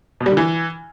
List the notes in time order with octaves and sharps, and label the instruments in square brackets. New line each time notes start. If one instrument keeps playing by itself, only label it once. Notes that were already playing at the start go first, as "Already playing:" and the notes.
[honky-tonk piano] B2
G3
D3
E3